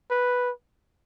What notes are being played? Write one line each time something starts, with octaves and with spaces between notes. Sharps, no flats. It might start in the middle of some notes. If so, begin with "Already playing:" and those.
B4